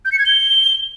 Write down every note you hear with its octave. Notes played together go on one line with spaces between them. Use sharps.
G6
C#7
G#6
G7